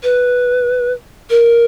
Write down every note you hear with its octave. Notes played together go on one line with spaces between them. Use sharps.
B4
A#4